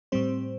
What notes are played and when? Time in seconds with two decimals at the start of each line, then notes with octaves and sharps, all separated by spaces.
0.12 A2 G3 C4 C5